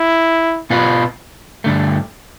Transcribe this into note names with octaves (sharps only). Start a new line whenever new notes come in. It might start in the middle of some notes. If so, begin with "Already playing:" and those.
Already playing: E4
B2 B3 F4 B4
G2 D3 A3